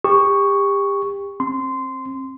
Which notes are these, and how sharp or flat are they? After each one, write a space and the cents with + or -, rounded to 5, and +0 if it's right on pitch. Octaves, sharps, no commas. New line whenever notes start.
G4 +30 C#6 +0
C4 +30 C6 -15